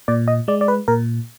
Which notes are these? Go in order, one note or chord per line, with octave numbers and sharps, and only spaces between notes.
A#2 D5
D#5
G#3 D5
D5
B4
A#2 A#4